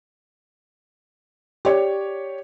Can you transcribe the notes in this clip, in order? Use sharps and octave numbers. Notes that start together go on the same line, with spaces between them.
G4 C#5 D5